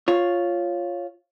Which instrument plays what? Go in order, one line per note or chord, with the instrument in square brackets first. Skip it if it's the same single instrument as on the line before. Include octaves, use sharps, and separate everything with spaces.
[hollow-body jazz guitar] F4 C#5